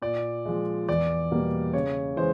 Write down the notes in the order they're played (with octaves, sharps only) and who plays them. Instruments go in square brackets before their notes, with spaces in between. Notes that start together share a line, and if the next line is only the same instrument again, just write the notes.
[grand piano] A#2 D5
F3 G#3
E2 D5
B2 G3 A#3
C#3 C#5
E3 G#3 C5